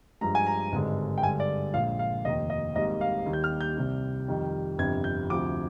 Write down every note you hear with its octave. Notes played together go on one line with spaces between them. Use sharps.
G2 F3 G#3 A#5
G#5
A#5
G#1 G2 D3 G#3
G5
G2 D3 G#3 G#5
D5
A#1 A#2 G#3 F5
F5
F1 D#2 D#3 D#5
D#5
G#1 G#2 G3 A#3 D#5
F5
D#2 D#3 G3 A#3
G6
F6
G6
C2 C3 G3
F2 D#3 G3
G1 F2 C3 G3 G#6
G6
D2 C3 F3 D6